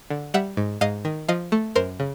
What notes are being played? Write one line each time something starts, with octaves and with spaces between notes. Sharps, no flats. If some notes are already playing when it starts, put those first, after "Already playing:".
D3
G3 E5 F#5
G#2
G#2 D#5 F5
D#3
F3 D#5 F5
A3
F#2 A#4 C5
C#3